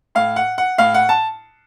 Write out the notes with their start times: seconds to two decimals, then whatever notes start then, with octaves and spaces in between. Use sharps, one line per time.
0.15 A2 F5
0.36 F#5
0.58 F#5
0.78 A2 F5
0.94 F#5
1.09 A5